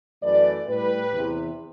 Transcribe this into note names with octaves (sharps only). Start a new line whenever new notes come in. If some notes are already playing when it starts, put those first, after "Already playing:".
F#2 E3 A3 B4 D5
A2 G3 G4 B4
E2 C3 E3